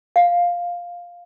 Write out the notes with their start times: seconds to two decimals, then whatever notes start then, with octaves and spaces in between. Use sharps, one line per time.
0.16 F5